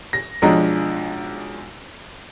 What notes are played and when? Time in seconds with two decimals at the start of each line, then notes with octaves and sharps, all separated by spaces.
0.13 A#6
0.42 B1 F3 G#3 D4 D#5 A#5